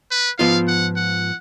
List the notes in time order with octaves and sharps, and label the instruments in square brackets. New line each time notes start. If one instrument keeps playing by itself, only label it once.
[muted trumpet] B4
[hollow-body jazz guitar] G#2 F3 B3 F4 [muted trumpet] F5
[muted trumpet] F#5
F#5